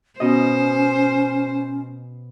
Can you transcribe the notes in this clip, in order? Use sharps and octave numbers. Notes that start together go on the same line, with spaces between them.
B2 C#4 C5 D#5